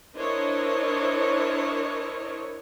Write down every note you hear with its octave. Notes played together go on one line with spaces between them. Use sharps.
D4 E4 A#4 C5 C#5 D#5